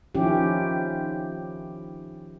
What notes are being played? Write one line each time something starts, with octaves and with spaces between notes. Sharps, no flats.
D#3 F3 C#4 E4 G4